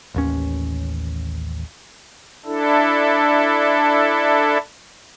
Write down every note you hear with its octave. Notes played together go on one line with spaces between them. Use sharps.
A1 D#2 C#4
D4 E4 A4